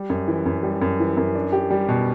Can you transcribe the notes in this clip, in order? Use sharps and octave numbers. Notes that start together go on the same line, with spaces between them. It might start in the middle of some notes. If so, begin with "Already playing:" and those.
Already playing: G3
F#2
E3
F#2
G3
F#2
E3
F#2
D4
G4
G3
B2